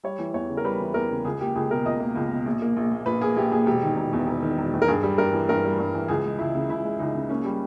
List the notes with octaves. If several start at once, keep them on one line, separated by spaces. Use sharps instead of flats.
G3 C#5
E3
E2 C#5
C#3
A#4
G3 B4
E3
E2 A#4
C#3
C#2 G#4
A#3 G4
C#2 G#4
B2 A#4
C#2 D#5
A#3
C#2
B2
A#1
A#3
A#1
A#2
A#1 B4
A#3 G#4
A#1 G4
A#2 G#4
E1 G4
D#3
E1
E2
E1
D#3
E1
E2
A#4
G2 G#4
G3
G2 A#4
E3
G2 A#4
G3
G2
E3
C#2 G#4
G#3
C#2 E4
C#3
C#2 E4
G#3
C#2 D#4
C#3
A#3 C#4
G3